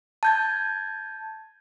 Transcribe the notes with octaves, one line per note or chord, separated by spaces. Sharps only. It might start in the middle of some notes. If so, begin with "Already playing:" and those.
A5 G6 G#6